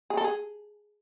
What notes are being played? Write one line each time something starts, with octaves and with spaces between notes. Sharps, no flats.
G#4
A4
G#4